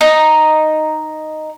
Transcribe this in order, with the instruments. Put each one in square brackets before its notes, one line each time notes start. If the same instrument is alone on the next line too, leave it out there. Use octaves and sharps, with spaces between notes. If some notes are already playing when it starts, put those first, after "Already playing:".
[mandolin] D#4